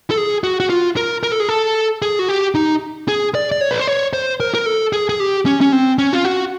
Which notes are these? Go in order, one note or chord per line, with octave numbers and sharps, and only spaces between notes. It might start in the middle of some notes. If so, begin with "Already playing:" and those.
A4
G#4
F#4
F#4
F4
A#4
A#4
A4
G#4
A4
G#4
F#4
G4
D#4
G#4
D5
D5
C#5
B4
C5
C#5
C5
A#4
A#4
A4
G#4
G#4
G4
C#4
C#4
C4
C#4
F4
F#4